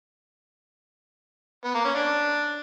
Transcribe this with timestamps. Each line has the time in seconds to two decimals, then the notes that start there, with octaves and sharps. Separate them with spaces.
1.64 B3
1.75 A#3
1.85 C#4
1.95 D4